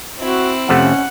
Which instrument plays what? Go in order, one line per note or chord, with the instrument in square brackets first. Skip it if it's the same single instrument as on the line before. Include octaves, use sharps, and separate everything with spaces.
[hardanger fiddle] C4 E4 [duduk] F#4
[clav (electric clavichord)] F2 C3 A3 [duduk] C#4 [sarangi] F#5